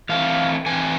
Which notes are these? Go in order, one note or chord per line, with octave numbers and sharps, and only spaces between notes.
E3 A3 C4 F5
E3 A3 C4 G#5